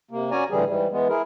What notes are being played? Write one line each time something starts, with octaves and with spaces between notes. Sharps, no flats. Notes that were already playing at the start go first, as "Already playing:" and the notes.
C3 A#3
C#4 F#4 D5 G#5 A#5
A2 D3 E3 G3 G#4
G#2 E3 G3
E3 G#3 B3
E4 G#4 A#4